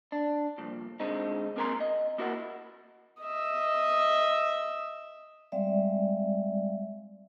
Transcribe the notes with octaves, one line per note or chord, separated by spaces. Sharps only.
D4
C2 F2 A#2
D3 G#3 C4 D#4
A#3 C4 A#4 G#5 A#5 C6
D#5
A#3 E4 F#4 A#4 E5 F#5
D#5 E5
G3 G#3 C4 D5 E5 F5